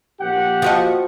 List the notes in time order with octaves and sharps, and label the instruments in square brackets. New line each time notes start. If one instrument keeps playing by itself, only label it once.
[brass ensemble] A#1 G4 F#5
[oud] F3 F#4 D#5